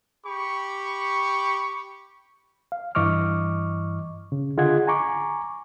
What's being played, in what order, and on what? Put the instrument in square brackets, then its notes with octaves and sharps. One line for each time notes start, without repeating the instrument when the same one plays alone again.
[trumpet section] G4 B5 C#6
[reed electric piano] F5
G2 E3 D#5 C#6 D6 F6
C#3
D3 F4 G#4 D#5 F#5 G#6
G#5 A#5 C#6 D6